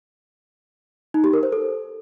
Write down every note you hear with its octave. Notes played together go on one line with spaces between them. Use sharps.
D#4
G4
A#4
C5
A4